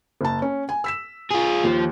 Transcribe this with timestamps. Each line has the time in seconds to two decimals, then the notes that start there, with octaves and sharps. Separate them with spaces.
0.21 F#1 A5
0.42 C#4
0.69 G#5
0.84 E6 B6 E7
1.31 F4 G#4
1.64 D#2 F3